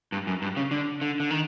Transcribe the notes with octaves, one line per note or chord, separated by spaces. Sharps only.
G2
F#2
G2
C#3
D3
D3
D3
D#3